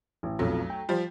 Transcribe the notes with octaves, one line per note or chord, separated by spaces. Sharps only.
A1
B1 F2 F#3 A3
G5
F3 G3 F4